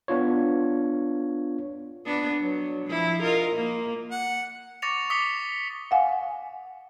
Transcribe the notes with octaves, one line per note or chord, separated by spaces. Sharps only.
B3 D4 F4 C#5
B3 D4
F#3
F3 E4
F4 A#4 D#5
A#3
F#5
C#6 D6 A6 A#6 C#7 F7
D6 D#6 B6 C#7 F7 G7
F5 F#5 G#5